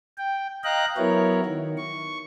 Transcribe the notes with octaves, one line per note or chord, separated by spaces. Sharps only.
G5
D#5 F5 G5 A#5 F#6
F#3 B3 E4 A#4 C#5
D#3
C#6